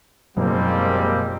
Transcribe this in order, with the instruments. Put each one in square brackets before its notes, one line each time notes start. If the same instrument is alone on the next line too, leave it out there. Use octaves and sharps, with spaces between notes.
[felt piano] F#1 [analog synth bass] B2 [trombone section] F3 G#3 A#3 [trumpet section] G3 C4